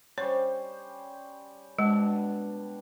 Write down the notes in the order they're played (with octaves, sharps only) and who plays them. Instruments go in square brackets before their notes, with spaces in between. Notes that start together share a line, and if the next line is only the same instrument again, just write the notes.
[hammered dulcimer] G3 C#4 C5 [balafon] C#5
[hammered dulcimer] B2 D4 [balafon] G#3